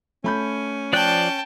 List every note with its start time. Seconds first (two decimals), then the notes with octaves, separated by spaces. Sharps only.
0.24 A3 C#4 B5 G6
0.93 F3 D5 G5 A5 F#6